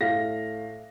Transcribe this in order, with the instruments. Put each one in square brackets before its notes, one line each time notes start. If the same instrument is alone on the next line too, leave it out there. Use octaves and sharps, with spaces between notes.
[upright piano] A2 F5 A#6